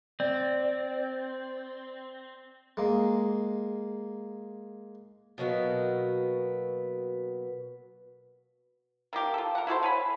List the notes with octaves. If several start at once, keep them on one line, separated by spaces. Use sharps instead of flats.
C4 D5
G#3 A#3
B2 F#3 A#3 B3
D#3 A#3 G4 A#4
F4 A4
A#4 F#5
E4 F#4 A4 C5
C#5 G#5 B5